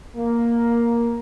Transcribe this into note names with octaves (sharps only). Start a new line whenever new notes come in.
A#3